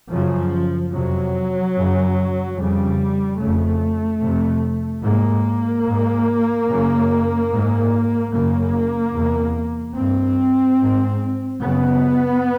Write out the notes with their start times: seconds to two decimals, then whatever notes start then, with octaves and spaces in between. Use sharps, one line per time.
0.11 F#2 C#3 F3
0.92 F2 C3 F#3
1.76 F#2 C#3
2.57 F2 C#3 G3
3.39 F2 C#3 A3
4.22 F2 C3
5.04 G#2 A#3
5.86 G#2
6.68 F#2 C#3
7.50 G#2
8.32 F#2 C#3 A#3
9.15 E2 C3
9.97 G2 C4
10.79 G#2
11.61 F#2 C#3 B3